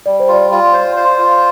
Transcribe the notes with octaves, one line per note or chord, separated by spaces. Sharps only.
G3 D5
C5
F4 D5
F4
C5
C5
F4